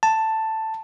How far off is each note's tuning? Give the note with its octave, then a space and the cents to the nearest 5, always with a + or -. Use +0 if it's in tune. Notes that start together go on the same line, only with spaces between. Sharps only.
A5 +5